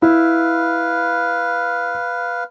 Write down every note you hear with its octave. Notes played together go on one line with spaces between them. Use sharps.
E4 B4 F5